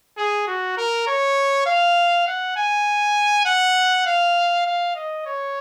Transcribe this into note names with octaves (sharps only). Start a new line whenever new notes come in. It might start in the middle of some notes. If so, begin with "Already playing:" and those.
G#4
F#4
A#4
C#5
F5
F#5
G#5
F#5
F5
F5
D#5
C#5